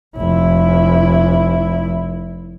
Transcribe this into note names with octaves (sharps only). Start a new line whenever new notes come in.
F1 E4